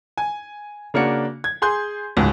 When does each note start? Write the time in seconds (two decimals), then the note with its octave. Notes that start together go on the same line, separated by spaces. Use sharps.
0.18 G#5
0.94 C#3 A#3 D4 F#4 C#7
1.44 G#6
1.62 G#4 G#5 C6 G6
2.16 D1 C#2 G#2